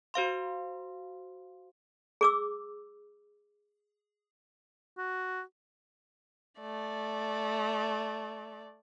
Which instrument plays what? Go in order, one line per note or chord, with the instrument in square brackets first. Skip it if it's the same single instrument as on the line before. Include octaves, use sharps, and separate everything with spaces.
[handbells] F#4 C5 F5 C6
[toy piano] G#4 D6 E6
[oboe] F#4
[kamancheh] A3 D5